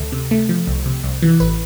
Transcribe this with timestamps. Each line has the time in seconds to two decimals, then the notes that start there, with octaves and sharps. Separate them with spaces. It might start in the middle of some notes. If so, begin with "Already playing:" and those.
Already playing: D2 A4
0.12 C3
0.31 A3
0.49 F3
0.67 C2
0.85 C3
1.04 C2
1.22 E3
1.40 A1 B4